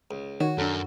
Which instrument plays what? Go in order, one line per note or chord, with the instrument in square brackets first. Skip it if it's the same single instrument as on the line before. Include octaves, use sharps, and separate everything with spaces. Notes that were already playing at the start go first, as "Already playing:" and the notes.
[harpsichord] C#2
[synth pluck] D#3 [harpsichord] F#4 [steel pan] C#5
[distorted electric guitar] F#2 [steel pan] D4 A4